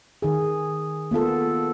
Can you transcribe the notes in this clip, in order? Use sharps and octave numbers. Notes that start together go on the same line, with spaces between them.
D#3 G#4
A#3 B3 F4 A4